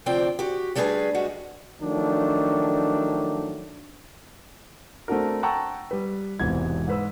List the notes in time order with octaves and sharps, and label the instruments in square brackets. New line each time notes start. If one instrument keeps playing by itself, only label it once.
[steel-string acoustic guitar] D2 C3 F3 C4 D5 G5
F#4 G4
G3 A3 D4 F4 G#4 B4
G3 G#3 F#4
[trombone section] D#3 F3 F#3 A3 D4
[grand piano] A3 C4 D4 F#4 A#4
F#5 G5 A5 A#5 C#6 E6
G3 B4
E1 E2 G#2 C3 E3 G#6
G#2 B4 E6